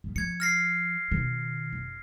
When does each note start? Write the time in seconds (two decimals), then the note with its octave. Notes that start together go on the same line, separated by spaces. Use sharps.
0.04 A2 G3
0.16 F3 G#6 C#7
0.40 F6 A#6 C7
1.11 B2 D#3
1.73 F#1